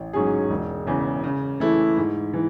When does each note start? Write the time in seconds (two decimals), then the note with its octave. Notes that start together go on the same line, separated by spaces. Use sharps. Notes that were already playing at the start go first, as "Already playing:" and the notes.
Already playing: A1
0.13 G#2 F#3 C#4 G#4
0.50 E1
0.87 E2 C#3
1.24 C#3
1.60 E3 A3 E4
1.97 G#2
2.33 E3